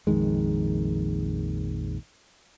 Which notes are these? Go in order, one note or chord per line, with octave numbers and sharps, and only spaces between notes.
A#1 F2 D#3 G#3